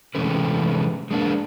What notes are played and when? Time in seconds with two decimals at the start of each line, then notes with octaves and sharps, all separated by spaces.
0.15 C3 E3 G#3 A3 C#4 B4
1.11 G#3 A#3 D4